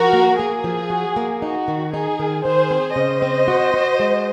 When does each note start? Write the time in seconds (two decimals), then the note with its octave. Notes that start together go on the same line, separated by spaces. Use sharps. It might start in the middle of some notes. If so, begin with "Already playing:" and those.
Already playing: F3 F#4 A#4
0.13 A#3
0.39 A#3 G#4
0.64 F3
0.90 F#4
1.16 A#3
1.42 D#4 F#4
1.68 D#3
1.93 D#4 G#4
2.20 D#3
2.45 D#3 G#4 C5
2.71 C4
2.96 C#3 C5 D#5
3.22 C4
3.48 F#4
3.74 F#4
4.00 G#3